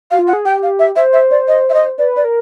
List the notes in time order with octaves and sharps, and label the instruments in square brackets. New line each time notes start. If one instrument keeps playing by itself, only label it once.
[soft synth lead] F#4 [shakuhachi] F5
[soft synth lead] F4
[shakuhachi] F#5
[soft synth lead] G#4
[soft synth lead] G4 [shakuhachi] G5
[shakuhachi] F5
E5
[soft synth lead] C5 [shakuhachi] E5
[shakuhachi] E5
D5
D#5
E5
D#5
[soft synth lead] B4 [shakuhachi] D5
[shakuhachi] D5
[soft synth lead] A#4